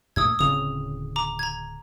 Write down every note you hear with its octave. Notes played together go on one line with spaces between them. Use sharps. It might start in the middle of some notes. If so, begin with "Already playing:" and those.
F#2 A#2 A3 D#6 E6 G#6
D1 C#3 C4 D#6 F7
A#5 D6
A#5 G#6